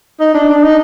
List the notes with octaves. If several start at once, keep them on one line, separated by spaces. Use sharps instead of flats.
D#4
D4
D4
D#4